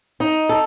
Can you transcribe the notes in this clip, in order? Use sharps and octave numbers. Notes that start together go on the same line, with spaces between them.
D#4
A4